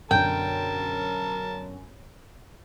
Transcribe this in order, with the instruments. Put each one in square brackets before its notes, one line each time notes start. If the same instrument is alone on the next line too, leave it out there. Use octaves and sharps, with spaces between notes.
[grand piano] F#2 B2 D3 [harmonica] A#4 A5 [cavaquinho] G5